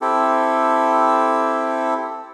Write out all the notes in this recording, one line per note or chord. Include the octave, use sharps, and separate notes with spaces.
C4 E4 G4 A4